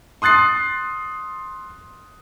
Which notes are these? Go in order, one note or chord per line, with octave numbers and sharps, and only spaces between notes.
C6 D#6 F#6 A6 C7